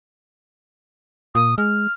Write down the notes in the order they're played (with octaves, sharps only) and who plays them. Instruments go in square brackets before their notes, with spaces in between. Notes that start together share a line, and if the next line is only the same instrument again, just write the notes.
[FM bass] A#2 [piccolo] D#6
[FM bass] G#3 [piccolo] F6